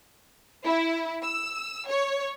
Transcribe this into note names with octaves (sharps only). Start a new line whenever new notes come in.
E4
E6
C#5